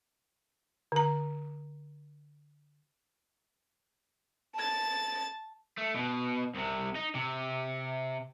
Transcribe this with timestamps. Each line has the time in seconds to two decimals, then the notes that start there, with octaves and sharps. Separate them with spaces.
0.92 D3 A#5
4.55 A5 A6
5.77 A3
5.95 B2
6.55 C2 C3
6.95 D#4
7.15 C3